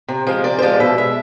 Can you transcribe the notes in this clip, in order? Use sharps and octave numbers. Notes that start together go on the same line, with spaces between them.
C3
F3 G#3
C3 D5
C5
F3 G#3 D5
B2 E5
G#3 E5